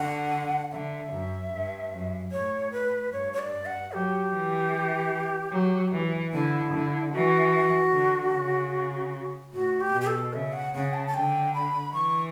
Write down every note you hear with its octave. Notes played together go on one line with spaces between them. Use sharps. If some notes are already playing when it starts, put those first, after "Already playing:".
Already playing: D3 F#5
D3 E5
F#2
G2
F#2
A2 C#5
B4
G2 C#5
C#5
D5
F#5
F#3 G4
E3
F#3
E3
D3 E4
D3
E3 F#4
D3
C#3
A2 F#4
G4
B2
G4
A4
C#3 E5
F#5
C#3 F#5
A5
A5
D3 G5
B5
E3 C#6